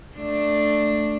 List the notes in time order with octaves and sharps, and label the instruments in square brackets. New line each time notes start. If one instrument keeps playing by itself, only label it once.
[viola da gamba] A3 D4